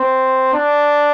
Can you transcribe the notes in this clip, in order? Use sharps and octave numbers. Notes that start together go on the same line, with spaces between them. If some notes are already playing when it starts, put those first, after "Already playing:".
Already playing: C4
D4